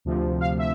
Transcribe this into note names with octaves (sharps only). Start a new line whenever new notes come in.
D2 C3 F3
F5
E5